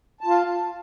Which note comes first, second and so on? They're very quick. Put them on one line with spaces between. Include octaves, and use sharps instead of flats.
A5 F4 F5